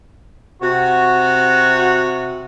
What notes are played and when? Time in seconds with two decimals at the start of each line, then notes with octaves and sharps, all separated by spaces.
0.62 C3 F#4